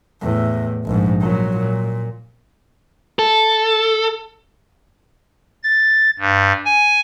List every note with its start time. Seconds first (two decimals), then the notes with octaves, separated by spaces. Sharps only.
0.21 E2 A2
0.86 A#1 G#2
1.22 A#2 F#3
1.57 A#2
3.19 A4
5.64 A6
6.19 G2
6.65 G#5